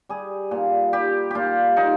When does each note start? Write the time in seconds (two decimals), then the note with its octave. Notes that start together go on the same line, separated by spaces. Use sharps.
0.09 G3 G#4
0.51 A#2
0.93 G3 G4
1.31 A#2 F4 G4
1.77 A#2 D#4